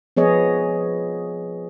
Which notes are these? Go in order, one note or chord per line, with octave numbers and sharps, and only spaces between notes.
F3 B3 G#4 C#5 D#5